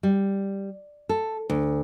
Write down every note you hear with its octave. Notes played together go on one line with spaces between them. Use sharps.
G3
A4
D2